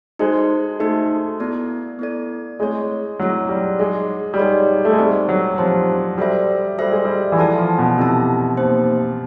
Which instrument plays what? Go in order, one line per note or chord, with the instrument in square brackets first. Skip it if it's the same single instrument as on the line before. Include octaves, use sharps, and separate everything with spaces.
[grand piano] G#3 [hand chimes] D#4 F#4 A4 C5
[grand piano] A3 [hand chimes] D#4 F#4 A4 C5
[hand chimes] B3 E4 A4 D5
B3 E4 A4 D5
[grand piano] G#3 [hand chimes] A3 C4 E4 G#4 C#5
[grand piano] F#3 [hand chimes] A3 C4 E4 G#4 C#5
[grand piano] G3
[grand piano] G#3 [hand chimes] D#4 G#4 C#5 F#5
[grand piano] G3
[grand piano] G#3 [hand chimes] D#4 G#4 C#5 F#5
[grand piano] A3
G#3
[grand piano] G3 [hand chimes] C4 D#4 G4 C5
[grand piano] F#3
[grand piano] F3 [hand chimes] C4 D#4 G4 C5
[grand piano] G3 [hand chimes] F#4 A4 C5 E5
[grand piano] G3 [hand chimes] F#4 A4 C5 E5
[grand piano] G#3
G3
E3
[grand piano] F3 [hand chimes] E4 A4 D5 F#5 A5
[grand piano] F3
B2
[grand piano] C3 [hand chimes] E4 A4 D5 F#5 A5
[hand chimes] A#3 D#4 G4 C5